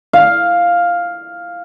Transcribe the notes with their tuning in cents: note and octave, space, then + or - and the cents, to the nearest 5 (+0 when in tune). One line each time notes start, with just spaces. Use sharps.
F5 +5